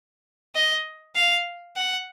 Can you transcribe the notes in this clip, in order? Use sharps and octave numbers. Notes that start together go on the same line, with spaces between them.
D#5
F5
F#5